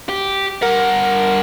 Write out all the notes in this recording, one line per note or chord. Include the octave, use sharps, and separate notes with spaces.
G4
G2 A#4 F#5